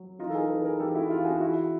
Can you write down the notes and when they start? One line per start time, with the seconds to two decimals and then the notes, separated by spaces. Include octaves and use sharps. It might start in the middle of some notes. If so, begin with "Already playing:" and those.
Already playing: F#3
0.19 E3 D#4 F4
0.30 A4
0.35 G#4 A#4
0.49 E3 A4 B4
0.65 G#4 A#4
0.79 E3 G4 A4
0.94 E4 F#4
1.10 E3 F4 G4
1.25 F#4 G#4
1.40 E3 E4 F#4